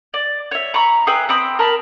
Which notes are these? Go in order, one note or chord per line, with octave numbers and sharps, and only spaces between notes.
D5
C#5 E5
A#5 B5 C#6
G#4 B4 E5 G5
C4 G5 B5 D#6
A#4 A5 B5